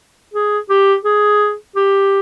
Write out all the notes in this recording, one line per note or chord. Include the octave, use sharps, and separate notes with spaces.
G#4
G4
G#4
G4